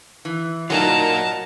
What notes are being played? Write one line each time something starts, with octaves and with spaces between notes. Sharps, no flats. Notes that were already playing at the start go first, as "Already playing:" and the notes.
E3
F#3 D#4 F4 A#4 D5 A5 A#5